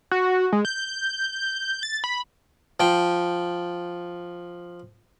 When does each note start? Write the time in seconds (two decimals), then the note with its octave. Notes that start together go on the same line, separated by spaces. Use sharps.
0.12 F#4
0.52 G#3
0.65 G6
1.83 A6
2.04 B5
2.80 F3 G5